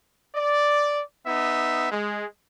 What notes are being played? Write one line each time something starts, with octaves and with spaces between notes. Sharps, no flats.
D5
B3 D#4 E5
G#3